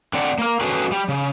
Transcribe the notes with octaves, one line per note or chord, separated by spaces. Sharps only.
D3 C4 D5 F#5
A#3 A#4
C#4 F#4 G#4 A4 B4
G3
C#3